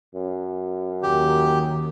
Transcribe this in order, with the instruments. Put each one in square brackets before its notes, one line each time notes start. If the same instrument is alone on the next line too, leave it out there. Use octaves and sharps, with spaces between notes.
[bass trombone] F#2
[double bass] D#2 D#3 [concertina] G4